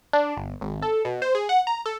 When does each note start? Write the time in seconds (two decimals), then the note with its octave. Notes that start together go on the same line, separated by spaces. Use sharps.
0.13 D4
0.37 G1
0.61 G#1
0.82 A4
1.05 B2
1.22 C5
1.35 G#4
1.49 F#5
1.67 A#5
1.86 A4